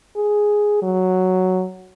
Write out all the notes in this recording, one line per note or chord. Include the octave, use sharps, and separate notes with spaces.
G#4
F#3